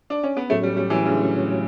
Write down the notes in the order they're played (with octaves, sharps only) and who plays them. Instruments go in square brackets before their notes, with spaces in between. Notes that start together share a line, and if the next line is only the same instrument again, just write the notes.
[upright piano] D4
C#4
B3
[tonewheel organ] A2 F#3 C#4 [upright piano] A3
[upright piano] G3
G3
E3
C#3
D3